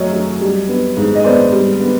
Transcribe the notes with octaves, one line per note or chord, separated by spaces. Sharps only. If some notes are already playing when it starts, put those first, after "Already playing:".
Already playing: F#2 F#3 A3 C#5 D#5
F#3
G3
B3
G#2
D#5
B3 C5 D5
G3
B3